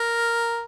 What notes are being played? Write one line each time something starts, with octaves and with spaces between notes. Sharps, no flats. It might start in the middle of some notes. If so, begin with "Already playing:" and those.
Already playing: A#4